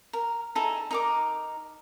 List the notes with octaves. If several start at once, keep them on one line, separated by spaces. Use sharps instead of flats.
A#4
D#4 E4 G#4 A4
D#4 A#4 D6